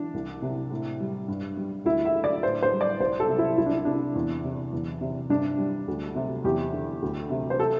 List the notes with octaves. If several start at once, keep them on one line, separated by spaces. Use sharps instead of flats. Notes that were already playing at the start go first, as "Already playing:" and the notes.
Already playing: E3 D4
C2
C3
A2
G3
G2
G3
D2 E4
E5
D3
D5
A2 C5
C5
G3
D5
C2 C5
A4
C3
E4
C2 E4
D4
C3 D4
E2
C3
E2
C3
G2 D4
G3
D2
C3
E2 G4
D3
D2
C3
C5
A4